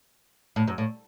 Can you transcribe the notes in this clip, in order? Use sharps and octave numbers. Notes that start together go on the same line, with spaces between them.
A2
F#2
A2